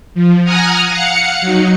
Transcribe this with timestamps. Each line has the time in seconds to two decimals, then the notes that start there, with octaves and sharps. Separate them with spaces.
0.14 F3
0.44 F#5 G#5 A#5 D#6 F6
0.89 F5 F#5 C#7
1.41 F#3 D#4